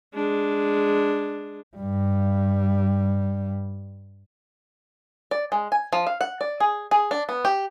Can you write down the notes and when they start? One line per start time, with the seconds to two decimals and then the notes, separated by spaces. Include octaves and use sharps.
0.14 G#3 D4
1.77 G2 G3
5.31 D5
5.52 G#3
5.72 G#5
5.93 F3
6.07 F5
6.21 F#5
6.41 D5
6.60 G#4
6.91 G#4
7.11 D4
7.29 B3
7.45 G4